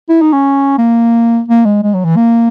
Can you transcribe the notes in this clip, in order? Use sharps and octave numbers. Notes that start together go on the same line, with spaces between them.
E4
D#4
C#4
A#3
A#3
G#3
G#3
F#3
E3
A#3